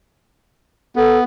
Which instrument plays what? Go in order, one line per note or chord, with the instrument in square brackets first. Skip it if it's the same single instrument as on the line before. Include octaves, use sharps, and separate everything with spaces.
[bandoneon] B3 [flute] A4